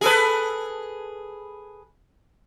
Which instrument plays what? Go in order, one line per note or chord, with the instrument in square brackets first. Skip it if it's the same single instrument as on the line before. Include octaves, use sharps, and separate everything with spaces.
[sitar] G#4 A4 B4